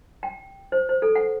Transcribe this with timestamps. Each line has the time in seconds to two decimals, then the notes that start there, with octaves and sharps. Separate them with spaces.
0.23 G5
0.72 C5
0.89 C5
1.02 A4
1.15 F#5